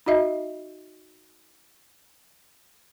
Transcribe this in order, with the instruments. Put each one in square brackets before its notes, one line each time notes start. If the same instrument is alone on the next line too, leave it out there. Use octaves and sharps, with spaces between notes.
[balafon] D#4 F#4 D#5 E5